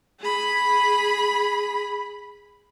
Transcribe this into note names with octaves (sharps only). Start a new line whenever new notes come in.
G#4 B5